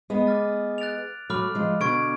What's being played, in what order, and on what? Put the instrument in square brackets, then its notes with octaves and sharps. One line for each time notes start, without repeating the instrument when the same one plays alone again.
[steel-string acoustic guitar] G#3 B3
[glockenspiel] D6 F6 A6
F#6 A6 D7 F7
[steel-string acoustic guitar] F#3 A3 [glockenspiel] B5 D6 F6
[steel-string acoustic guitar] F3 G#3
[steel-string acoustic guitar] B2 D3 [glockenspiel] C#6 G#6 D7